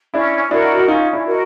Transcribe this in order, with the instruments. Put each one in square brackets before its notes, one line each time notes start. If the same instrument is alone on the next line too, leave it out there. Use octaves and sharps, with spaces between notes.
[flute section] C#4 [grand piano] D4 E4
[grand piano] D4 E4 [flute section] F#4 A#4 D#5
[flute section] C#4 [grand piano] D#4 F4
[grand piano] D4 E4
[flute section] F#4 A#4 D#5